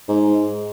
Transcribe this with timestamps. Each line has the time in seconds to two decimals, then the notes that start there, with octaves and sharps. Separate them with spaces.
0.08 G#2